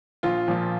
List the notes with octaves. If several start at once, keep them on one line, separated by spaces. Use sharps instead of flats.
A#1 F4
A#2 F3